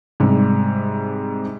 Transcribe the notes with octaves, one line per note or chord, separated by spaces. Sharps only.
G#2 C3 G3